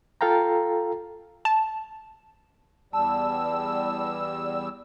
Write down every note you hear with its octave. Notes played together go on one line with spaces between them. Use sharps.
F4 A4 F5 G5 A#5
A5
E2 G3 A5 E6